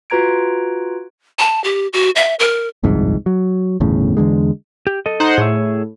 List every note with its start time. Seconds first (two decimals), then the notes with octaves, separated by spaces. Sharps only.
0.10 F4 F#4 B4 A#5 G#6 D7
1.39 A5
1.64 G4
1.93 F#4
2.16 E5
2.39 A#4
2.83 G1 C2 F2 G#2
3.26 F#3
3.80 G1 E2 A2 C#3
4.17 E2 D3 G#3
4.87 G4
5.06 A4 D#5
5.20 D#4 C5 F#5
5.38 A2 G#4 C#5 E5